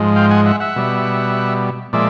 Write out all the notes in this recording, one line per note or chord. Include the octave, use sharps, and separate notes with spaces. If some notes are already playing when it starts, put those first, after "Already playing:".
Already playing: G#2 F3 G#3
F5 G5
F#5 G#5
E5 F#5
E5 F#5
B2 G3
A#2 F3 G#3 D5 E5